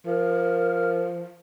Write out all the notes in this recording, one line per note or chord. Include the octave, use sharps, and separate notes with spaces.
F3 A#4